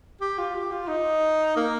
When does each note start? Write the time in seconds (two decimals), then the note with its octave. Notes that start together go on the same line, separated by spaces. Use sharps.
0.21 G4
0.38 F4
0.54 G4
0.71 F4
0.88 D#4
1.56 A#3